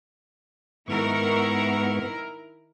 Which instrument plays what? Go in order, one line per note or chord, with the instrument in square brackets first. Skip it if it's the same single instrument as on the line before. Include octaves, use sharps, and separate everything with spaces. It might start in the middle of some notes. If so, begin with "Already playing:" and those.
[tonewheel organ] G#2 B3 C#6 [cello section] D#3 E4 A#4